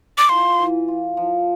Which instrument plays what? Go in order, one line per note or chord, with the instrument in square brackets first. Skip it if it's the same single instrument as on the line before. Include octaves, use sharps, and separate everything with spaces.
[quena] D6
[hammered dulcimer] F4 [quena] C6
[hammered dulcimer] E3
F4
F3